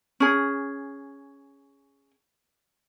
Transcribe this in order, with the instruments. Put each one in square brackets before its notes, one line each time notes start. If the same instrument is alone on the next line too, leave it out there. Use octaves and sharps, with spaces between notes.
[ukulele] C#4 G#4